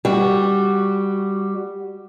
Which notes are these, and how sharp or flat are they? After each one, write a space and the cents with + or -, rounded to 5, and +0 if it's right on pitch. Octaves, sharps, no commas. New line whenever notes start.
G3 +5 F#4 +5